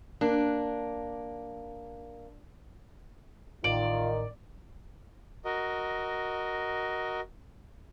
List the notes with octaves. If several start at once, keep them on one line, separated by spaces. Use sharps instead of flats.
A#3 D4
A1 D#3 F4 D5
F#4 A#4 D#5